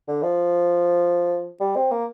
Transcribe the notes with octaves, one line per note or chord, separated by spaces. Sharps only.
D3
F3
G3
C4
A#3